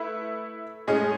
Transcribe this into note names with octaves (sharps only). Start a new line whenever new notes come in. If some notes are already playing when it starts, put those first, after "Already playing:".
Already playing: A3 E4 B4 E5
A2 G#3 C#4 G#4 D#5